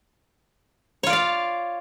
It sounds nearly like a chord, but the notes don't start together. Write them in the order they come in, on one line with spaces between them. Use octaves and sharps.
C#5 F4 D5 F5